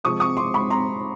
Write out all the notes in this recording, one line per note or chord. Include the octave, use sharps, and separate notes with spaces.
C3 F3 G#3 C#6 D#6
C#6 D#6
C6 D6
B5 C#6
A#5 C6